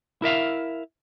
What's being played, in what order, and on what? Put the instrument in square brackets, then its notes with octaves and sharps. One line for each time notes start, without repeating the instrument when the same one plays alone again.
[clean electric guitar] E4 A#4 E5 F5